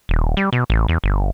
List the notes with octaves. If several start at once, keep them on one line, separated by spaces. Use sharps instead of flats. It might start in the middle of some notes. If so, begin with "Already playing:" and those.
D#1
G3
B2
A1
E2
G1